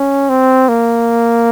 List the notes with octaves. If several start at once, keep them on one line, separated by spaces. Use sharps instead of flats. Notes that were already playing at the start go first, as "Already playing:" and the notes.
Already playing: C#4
C4
A#3